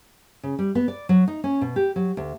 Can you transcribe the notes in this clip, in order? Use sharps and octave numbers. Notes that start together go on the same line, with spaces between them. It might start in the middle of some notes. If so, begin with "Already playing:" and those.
C#3
G3
B3
D5
F#3
D#4
C#4
B2
G4
F#3
D2